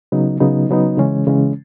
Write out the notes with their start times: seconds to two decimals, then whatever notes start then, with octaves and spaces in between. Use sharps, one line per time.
0.12 C#3 F#3 B3 D#4
0.40 C#3 F#3 B3 D#4
0.69 C#3 F#3 B3 D#4
0.98 C#3 E3 G#3 C#4
1.27 C#3 E3 G#3 C#4